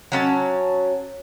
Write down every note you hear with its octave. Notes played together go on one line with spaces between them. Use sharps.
F#3 C#4 A5